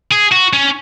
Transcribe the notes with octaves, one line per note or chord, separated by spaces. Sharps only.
G#4
F#4
C#4